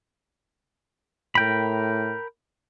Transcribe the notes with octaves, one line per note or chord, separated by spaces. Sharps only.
A2 A#4 G5 B5